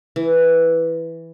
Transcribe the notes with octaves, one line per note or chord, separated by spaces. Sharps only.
E3